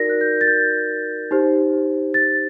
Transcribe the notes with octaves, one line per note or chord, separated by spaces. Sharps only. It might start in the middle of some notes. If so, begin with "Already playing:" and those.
Already playing: D#4 F#4 A#4 D5 A#6
F#6
G6
A6
G6
D#4 G4 C5
A6